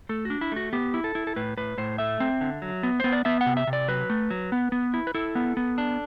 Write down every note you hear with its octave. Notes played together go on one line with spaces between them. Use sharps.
A3 A4
D4 F#4
E4
A3 F#4
B3 G4
E4
A4
E4
A4
A2 B4
A2 B4
A2 C5
A3 E5
C4
D3
F#3
B3
B3 C5
D5
B3 E5
F#5
C3
E5
C3
D5
F#3 B4
A3
F#3
B3
B3
E4
B4
E4 A4
B3
B3
D4